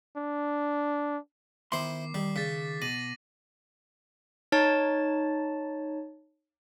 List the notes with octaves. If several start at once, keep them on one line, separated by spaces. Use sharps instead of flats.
D4
D#3 B3 E4 C5 C6 D6 C7
D#3 G3
C#3 A6 B6
B2 D6 A#6 D#7 F#7
D#4 C#5 A5 A6